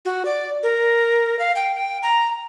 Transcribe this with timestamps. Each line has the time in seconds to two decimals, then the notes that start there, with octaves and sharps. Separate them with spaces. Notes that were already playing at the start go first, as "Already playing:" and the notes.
0.05 F#4
0.25 D5
0.63 A#4
1.39 F5
1.56 G5
1.75 G5
2.03 A#5